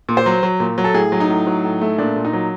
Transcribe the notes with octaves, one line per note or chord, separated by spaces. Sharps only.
A#2
C5
F#3
F#3
A#2
F#3
A4
A2 G#4
F#3
D#4
A2
F#3
A2
A3
A#2 D4
A#2
D#4
F#3